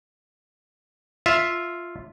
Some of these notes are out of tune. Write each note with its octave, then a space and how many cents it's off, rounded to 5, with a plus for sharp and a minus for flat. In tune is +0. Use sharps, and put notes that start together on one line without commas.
F4 +0 E5 +0